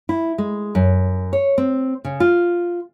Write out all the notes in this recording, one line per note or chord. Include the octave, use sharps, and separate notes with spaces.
E4
G#3
F#2
C#5
C4
C#3
F4